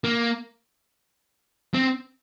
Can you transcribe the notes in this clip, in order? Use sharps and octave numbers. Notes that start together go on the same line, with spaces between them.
A#3
C4